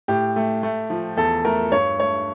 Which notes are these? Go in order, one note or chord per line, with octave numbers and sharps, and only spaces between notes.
A2 G4
A3
A3
F3
E2 A4
A3 A#4
G2 C#5
A3 C#5